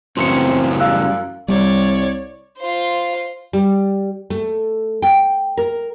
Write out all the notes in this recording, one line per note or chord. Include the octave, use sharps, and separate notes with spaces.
F#2 A2 C#3 E3 C4 C6 C#7
G3 F5 E6 F#6
C2 G3 C#5 D5
F4 C5
G3
A3
G5
A#4